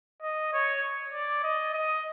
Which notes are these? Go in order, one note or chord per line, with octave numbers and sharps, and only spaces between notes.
D#5
C#5
D5
D#5
D#5